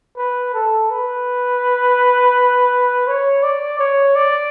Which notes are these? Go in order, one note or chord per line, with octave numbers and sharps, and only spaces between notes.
B4
A4
B4
C#5
D5
C#5
D5